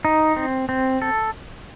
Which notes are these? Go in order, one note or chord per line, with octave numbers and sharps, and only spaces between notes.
D#4
C4
C4
A4